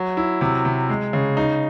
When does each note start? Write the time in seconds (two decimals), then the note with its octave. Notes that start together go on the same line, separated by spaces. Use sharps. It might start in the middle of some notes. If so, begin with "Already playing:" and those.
Already playing: F#3
0.17 E4
0.41 C3
0.65 C3
0.89 G#3
1.13 C#3
1.37 D#4